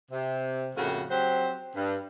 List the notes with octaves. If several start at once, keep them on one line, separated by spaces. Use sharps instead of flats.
C3
F2 A2 C#3 A#3 F#4
F#3 C4 G4 C5
G2